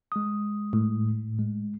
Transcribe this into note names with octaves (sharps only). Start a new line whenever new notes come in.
G#3 D#6
A2
G#3